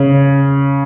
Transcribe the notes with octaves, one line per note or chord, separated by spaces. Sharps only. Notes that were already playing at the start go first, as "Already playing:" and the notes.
Already playing: C#3